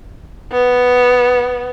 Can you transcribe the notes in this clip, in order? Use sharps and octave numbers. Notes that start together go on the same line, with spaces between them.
B3